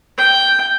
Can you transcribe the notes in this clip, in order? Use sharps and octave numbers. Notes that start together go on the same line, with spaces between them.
G5